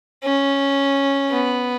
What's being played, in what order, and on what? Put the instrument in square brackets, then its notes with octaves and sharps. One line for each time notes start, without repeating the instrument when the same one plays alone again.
[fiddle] C#4
B3